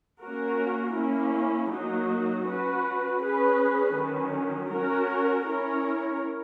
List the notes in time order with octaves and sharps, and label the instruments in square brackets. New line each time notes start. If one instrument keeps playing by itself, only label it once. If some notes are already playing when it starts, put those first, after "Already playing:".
[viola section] A#3 C#4 F#4 A#4
A#3 C#4 E4
F#3 A#3 D#4 F#4
C#4 F#4 B4
C#4 G#4 B4
D#3 F#3 C#4
C#4 F#4 A#4 C#5
C#4 E4 A#4 C#5